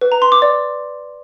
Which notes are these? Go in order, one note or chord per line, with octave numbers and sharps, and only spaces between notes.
B4
A#5
C6
D6
D5